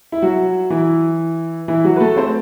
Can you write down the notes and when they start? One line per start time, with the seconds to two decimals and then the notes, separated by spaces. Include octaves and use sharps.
0.12 E4
0.22 F#3 F#4
0.70 E3 E4
1.68 E3 E4
1.84 F#3 F#4
1.96 B4
2.00 A3 A4
2.16 C4 C5